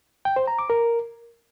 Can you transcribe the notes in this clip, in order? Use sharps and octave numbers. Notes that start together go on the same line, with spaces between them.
G5
C5
A#5
D6
A#4